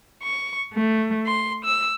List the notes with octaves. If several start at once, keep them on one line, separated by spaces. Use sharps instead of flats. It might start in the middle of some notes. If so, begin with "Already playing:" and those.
C#6
A3
C6
E6